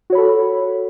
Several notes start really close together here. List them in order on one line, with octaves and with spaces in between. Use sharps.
F#4 C#5 B5 A4